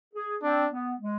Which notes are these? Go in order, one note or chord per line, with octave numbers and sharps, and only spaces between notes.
G#4
C4 D4
B3
G#3